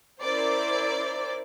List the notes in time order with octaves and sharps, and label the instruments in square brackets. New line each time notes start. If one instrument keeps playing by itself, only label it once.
[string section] C#4 E4 A#4 C5 D5